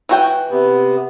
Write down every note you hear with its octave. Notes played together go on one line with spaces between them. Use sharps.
E3 F#4 G5
C3 B3